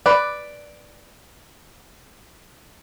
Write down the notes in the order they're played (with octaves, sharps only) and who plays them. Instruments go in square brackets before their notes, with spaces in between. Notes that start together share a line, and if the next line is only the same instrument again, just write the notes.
[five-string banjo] B4 D5